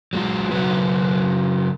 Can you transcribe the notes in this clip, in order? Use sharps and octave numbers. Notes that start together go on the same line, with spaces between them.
F#3 G#3 F4
C#3 F#3 F#4 B4